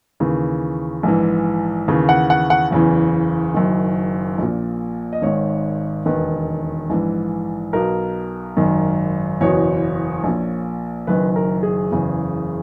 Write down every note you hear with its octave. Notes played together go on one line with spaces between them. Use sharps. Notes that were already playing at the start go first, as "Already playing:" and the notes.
D#2 C#3 E3
A#1 G#2 E3
D#2 C#3 E3
F#5
F#5
F#5
F#1 E2 C#3 E3
F#1 F#2 D#3
A#1 A#2
D#5
G#1 G#2 D#3 C#5
E1 D#2 D#3 B4
A#1 G#2 E3
B1 B2 A#4
G#1 F#2 D#3
F#1 E2 B2 C#5
A#1 A#2
F#1 F#2 D#3 B4
A#4
G#4
F#1 E2 C#3 E3